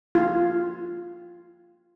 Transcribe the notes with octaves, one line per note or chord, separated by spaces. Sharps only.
F4